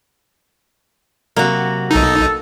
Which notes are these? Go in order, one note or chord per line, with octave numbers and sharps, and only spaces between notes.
C3 F#3 A#3 F#4
B1 D#4 A4